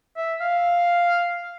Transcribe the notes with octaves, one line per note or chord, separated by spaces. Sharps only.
E5
F5